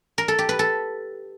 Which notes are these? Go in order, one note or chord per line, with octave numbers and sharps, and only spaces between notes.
A#4
A4
G4
B4
A4